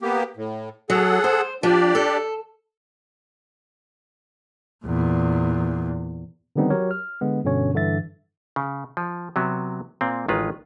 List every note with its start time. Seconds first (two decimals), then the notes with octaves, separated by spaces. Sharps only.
0.01 A#3 B3 G4
0.37 A2
0.90 F#3 G#4 A4 F#5
1.24 C5
1.63 F3 D4 G4 D5
1.95 A4
4.85 E2 A#2
6.56 D3 D#3 G3 B3 C4 D#4
6.70 F#3 F#4 G4 A#4 C#5
6.91 F6
7.21 D3 G#3 B3
7.44 G2 B2 D3 C#4 C#5
7.74 G2 D3 E3 E5 A6
8.56 C#3
8.97 F3
9.36 C3 F#3 B3
10.01 A#2 A#3 C4
10.28 A1 D#3 G#3 F4 B4